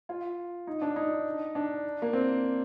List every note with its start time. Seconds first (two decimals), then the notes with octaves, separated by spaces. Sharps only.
0.09 F4
0.67 D#4
0.82 D4
0.96 D#4
1.55 D4
2.02 A#3
2.13 C4